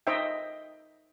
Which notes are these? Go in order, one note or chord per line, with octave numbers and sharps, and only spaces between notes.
D#4 C5 D#5 E5 G5